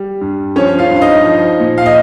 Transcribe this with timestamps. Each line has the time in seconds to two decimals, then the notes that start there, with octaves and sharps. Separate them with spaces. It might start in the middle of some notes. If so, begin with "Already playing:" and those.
Already playing: G3
0.21 G2
0.56 F3 C#4 C#5
0.79 F4 F5
0.90 G2
0.96 F5
1.02 D#4 D#5
1.26 F3
1.60 A#2
1.78 F5
1.86 D#5